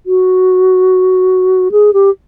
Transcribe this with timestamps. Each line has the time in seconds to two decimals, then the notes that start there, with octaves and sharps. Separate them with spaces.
0.06 F#4
1.71 G#4
1.93 G4